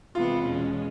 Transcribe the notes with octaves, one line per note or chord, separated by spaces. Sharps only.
C3 E3 G#3 B3 F4
E2 B2 G#3 C#4